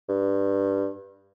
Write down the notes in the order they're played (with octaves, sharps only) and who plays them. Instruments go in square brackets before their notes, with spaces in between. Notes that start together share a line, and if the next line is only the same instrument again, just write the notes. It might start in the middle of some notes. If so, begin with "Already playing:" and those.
[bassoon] G2